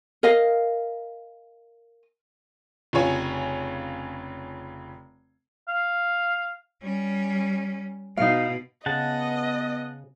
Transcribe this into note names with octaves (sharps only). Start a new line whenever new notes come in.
A#4 D#5 F5
F1 C#3 F4 C#5 G#5
F5
G3 C#4
B2 D#4 F5
C#3 B3 D#5 F#5 A5